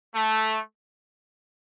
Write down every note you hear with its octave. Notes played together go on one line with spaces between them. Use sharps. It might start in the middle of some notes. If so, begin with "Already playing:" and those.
A3